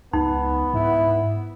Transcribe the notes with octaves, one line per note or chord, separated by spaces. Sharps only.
C#2 B3 D#4
G#2 E4